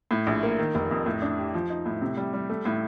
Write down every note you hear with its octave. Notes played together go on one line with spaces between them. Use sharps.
A2
A#1
A#3
D#3
F1
F2
A2
D4
G4
F3
D#4
A2
C3
G3
G3
A3
A2